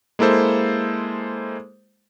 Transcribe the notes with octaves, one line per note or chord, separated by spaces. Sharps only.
G#3 A#3 E4 A4 C5